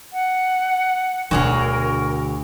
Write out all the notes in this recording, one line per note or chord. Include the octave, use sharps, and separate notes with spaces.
F#5
D2 B2 D3 F#4 G#4 A#4 C#5 C7